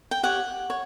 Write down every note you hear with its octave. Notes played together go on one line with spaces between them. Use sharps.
G5
G4 C#5 F#5
C#5